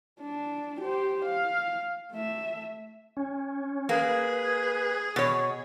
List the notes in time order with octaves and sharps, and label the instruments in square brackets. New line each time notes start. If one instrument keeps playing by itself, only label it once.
[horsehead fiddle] D4
G4 C5
F5
A3 E5
[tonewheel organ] C#4
[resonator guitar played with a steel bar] A#3 [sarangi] G#4 [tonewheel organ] B4
[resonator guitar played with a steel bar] B2 C#5